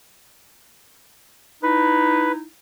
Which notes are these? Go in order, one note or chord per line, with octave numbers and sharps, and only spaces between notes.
D#4 E4 B4